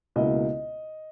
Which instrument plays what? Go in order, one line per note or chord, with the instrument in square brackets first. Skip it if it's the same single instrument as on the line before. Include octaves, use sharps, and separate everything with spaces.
[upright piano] C#2 B2 A#3 E4 D#5